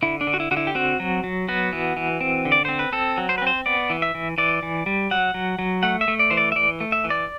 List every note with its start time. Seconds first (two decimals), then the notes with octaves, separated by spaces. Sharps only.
0.02 D3 E4
0.21 D4
0.27 D3
0.34 F#4
0.40 E4
0.51 D3 F#4
0.57 E4
0.67 G4
0.75 C4 F#4
1.00 F#3
1.24 F#3
1.48 B3 F#4
1.73 E3
1.97 E3
2.21 C4
2.45 D3
2.52 D5
2.65 C4 C5
2.79 B4
2.92 C4 A4
3.17 F#3
3.29 C5
3.38 B4
3.42 C4 C5
3.66 B3 D5
3.90 E3
4.02 E5
4.15 E3
4.38 E3 D5
4.63 E3
4.86 G3
5.11 F#3 F#5
5.34 F#3
5.59 F#3
5.83 A3 F#5
6.01 E5
6.08 A3
6.19 D5
6.30 E3 C5
6.37 D5
6.52 E5
6.56 E3 D5
6.80 A3
6.92 E5
7.04 E3
7.10 D5